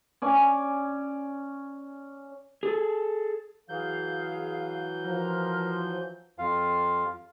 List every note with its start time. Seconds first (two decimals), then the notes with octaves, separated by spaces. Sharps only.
0.22 C#4 D5 G#5
2.63 G#4 A4
3.69 E3 F#3 G#4 F5 G6
5.05 F3 A#4 A#5 F6
6.39 F2 F4 F5